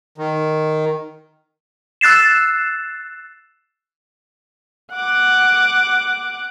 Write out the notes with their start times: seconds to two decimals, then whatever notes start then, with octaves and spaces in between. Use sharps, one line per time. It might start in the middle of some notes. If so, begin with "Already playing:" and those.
0.18 D#3
2.01 E6 F#6 A6 C7 E7
4.93 F#5 D6